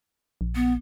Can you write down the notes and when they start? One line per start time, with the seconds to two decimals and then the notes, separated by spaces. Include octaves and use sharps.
0.41 A#1
0.55 B3